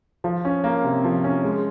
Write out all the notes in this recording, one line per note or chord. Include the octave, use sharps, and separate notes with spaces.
F3
C#4
A#3
C3
F3
C#4
G#3